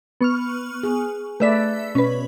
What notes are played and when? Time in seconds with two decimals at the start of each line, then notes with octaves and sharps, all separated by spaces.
0.21 B3 C#6 F6
0.83 G#4
1.40 A3 B4 D5 E5 B6
1.95 B2 C#4 B4